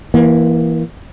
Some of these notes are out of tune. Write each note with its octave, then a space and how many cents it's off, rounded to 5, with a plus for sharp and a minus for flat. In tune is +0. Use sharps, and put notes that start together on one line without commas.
E3 +0 A#3 +20